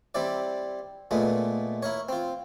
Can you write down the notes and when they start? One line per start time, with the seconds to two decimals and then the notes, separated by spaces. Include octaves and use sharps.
0.15 G3 C4 E4 D5
1.11 A#2 G#3 A3 B3
1.83 E4 A#4 C#5
2.09 C4 F4